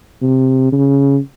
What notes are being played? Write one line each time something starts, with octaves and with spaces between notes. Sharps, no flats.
C3
C#3